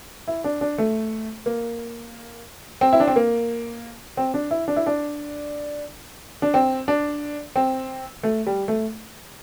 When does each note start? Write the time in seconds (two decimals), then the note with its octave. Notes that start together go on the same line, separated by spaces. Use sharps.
0.28 E4
0.44 D4
0.61 D4
0.78 A3
1.46 A#3
2.81 C4
2.93 E4
3.00 D4
3.08 C4
3.16 A#3
4.17 C4
4.34 D4
4.51 E4
4.68 D4
4.76 E4
4.86 D4
6.42 D4
6.54 C4
6.88 D4
7.56 C4
8.23 A3
8.47 G3
8.68 A3